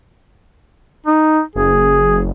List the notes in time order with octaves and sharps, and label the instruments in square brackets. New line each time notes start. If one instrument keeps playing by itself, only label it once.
[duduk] D#4
[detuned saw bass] F#1 [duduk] G#4